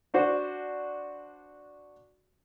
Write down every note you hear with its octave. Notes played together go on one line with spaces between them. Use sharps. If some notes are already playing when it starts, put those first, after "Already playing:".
D4 F#4 C5